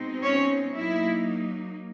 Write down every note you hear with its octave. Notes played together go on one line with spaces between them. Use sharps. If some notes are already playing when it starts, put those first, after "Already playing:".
Already playing: B2 G#3 C4 D#4
C#4 C#5
F#3 A#3 D#4 E4 E5